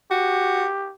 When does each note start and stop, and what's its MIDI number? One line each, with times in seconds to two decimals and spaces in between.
0.11 0.65 66
0.11 0.93 67